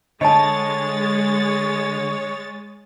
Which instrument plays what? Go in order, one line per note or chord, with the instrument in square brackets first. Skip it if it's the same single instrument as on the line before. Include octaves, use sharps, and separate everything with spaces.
[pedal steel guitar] D3 [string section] G#3 A6 [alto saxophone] C#5 [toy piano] D#5 A5